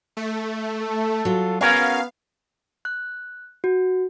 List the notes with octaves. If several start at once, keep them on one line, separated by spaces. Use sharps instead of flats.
A3
A4
F#3 F4
B3 C#4 F#4 G#4 A#4 F5
F#6
F#4